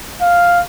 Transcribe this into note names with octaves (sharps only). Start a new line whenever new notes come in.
F5